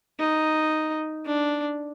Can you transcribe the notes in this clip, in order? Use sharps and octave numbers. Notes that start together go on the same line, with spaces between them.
D#4
D4